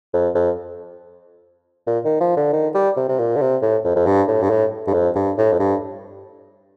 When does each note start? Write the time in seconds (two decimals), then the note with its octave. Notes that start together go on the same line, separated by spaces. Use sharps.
0.14 F2
0.35 F2
1.87 A#2
2.05 D#3
2.21 F3
2.37 D3
2.53 D#3
2.75 G3
2.97 C3
3.09 C3
3.19 A#2
3.36 D3
3.41 C3
3.62 A2
3.84 F2
3.96 F2
4.07 G2
4.28 A2
4.43 G2
4.50 A2
4.87 G2
4.94 F2
5.15 G2
5.38 A2
5.52 F2
5.60 G2